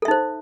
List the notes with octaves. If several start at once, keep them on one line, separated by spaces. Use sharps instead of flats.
D#4 A4 C5 E5